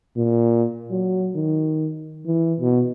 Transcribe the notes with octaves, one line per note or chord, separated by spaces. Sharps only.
A#2
F#3
D#3
E3
B2